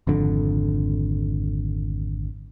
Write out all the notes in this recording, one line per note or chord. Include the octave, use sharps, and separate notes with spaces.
G#1 F2 D3